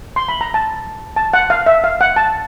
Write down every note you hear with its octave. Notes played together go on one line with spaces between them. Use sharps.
C6
B5
A#5
A5
A5
F#5
F5
E5
F5
F#5
A5